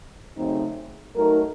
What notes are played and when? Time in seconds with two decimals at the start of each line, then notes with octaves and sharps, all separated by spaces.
0.35 F#2 C#3 A3 C4 D#4
1.14 F#3 A3 D#4 A#4